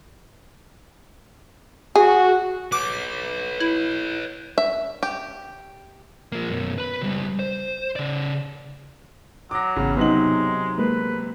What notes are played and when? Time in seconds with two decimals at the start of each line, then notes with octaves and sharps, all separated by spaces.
1.96 F#4 G#4
2.72 B4 C#5 D6
3.60 E4
4.58 E5
5.03 G4
6.32 F3 A#3
6.50 F#2 B2
6.78 B4 B5
7.01 C#2 G3
7.39 C5
7.96 C#3 D5
9.51 F#3 D6 A#6
9.76 G#1 E2 C#3
9.97 C3 F#3 G#3 B3 D#4 F#7
10.78 G#3 A#3 B4